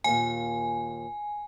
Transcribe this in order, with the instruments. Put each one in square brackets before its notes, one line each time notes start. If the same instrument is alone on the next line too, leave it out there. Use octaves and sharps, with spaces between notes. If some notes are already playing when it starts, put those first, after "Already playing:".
[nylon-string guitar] D#2 A#2 [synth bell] G#5